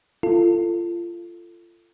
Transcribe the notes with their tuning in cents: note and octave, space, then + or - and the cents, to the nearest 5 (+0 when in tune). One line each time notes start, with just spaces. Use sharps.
F4 -25 A4 +15